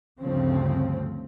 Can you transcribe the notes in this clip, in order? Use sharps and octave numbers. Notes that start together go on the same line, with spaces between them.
D2 G2 C#3 F3 C4